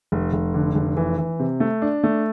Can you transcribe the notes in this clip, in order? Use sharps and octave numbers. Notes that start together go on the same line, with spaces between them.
F1
F1
D3
F1
E3
E3
C3
A3
D4
A3